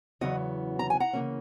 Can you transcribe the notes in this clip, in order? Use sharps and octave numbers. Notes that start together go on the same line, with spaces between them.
E2 C#3 F#3 B3 D#5 F#5
A#5
G#5
F#5 A#5
C#3 E3 A#3 C#4